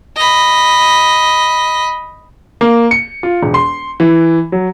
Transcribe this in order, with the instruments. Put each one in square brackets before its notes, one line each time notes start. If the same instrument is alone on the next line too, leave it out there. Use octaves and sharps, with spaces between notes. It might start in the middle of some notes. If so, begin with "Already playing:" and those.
[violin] D#5 B5
[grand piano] A#3
C#7
F4
E1
C6
E3
F#3